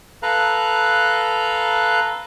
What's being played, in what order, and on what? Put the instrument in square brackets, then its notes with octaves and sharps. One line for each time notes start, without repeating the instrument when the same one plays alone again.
[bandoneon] A4 B4 F5 A#5 F#6